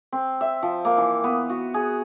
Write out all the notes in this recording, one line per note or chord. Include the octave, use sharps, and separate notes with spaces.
C4
E5
F3
A#3
E3
B3
F#4
G#4